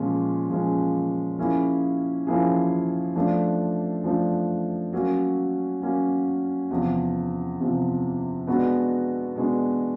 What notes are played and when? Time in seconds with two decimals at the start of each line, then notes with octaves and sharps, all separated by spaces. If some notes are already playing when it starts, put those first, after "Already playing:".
Already playing: A#2 F3 G#3 C#4
0.50 A#2 F3 G#3 C#4
1.38 F3 A#3 C#4 E4 G#4
2.27 F3 A#3 C#4 E4 G#4
3.16 F3 A3 D4
4.04 F3 A3 D4
4.93 F#3 A#3 C#4
5.82 F#3 A#3 C#4
6.71 E2 C3 F3
7.59 E2 C3 F3
8.47 B2 G#3 B3 D4 F#4
9.36 B2 G#3 B3 D4 F#4